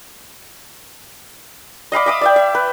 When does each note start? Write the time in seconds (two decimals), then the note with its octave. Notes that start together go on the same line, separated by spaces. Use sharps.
1.92 D#5 F5 B5 D6
2.06 E5 D6 D#6
2.21 D5 E5 G5
2.36 E5
2.55 B4